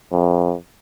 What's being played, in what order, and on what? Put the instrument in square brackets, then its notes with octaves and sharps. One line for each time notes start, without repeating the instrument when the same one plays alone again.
[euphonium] F2